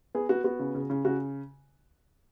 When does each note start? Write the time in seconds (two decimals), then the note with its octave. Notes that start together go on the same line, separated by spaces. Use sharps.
0.15 B3 G#4
0.29 B3 F#4
0.44 B3 F#4
0.59 C#3
0.74 C#3
0.90 C#3
1.05 C#3 F#4